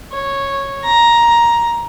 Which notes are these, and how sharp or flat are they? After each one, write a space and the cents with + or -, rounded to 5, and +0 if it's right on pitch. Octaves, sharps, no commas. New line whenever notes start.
C#5 -10
A#5 +10